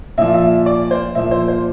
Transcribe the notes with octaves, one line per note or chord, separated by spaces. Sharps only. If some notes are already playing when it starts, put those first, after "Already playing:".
A#2 F3 E5
E5
D5
C5
A#2 F3 E5
C5
C5